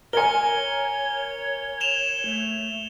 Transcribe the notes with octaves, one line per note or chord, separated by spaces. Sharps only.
A#4 C#5 G#5 C#7 G7
E7 F7 G7
A3